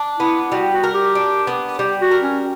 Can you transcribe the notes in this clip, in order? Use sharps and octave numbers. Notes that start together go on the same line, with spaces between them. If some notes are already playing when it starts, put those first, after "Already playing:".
Already playing: D4
B3 E4
G3 F#4
F#4
A#4
G4
D4
B3
G3 G4
F#4
A#4
C#4